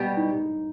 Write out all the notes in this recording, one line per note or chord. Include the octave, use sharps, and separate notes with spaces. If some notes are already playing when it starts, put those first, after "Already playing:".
Already playing: B2 G3 B3 G4
D#4